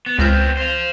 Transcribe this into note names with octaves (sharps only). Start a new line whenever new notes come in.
B3
C#2 B3 C4 F6 G6
C5 F5